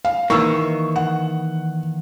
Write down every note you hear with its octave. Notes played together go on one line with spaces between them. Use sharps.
F5
D#3 E3 A#3 C#6 E6
F#5